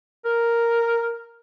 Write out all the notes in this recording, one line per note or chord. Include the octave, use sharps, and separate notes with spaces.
A#4